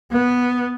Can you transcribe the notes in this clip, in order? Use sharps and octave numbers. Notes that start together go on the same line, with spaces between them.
B3